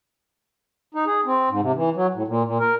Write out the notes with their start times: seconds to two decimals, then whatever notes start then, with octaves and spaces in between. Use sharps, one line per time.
0.95 D#4
1.06 G#4
1.26 C4
1.50 G#2
1.61 C3
1.75 E3
1.96 F#3
2.14 A2
2.28 A#2
2.44 A#2
2.60 A#4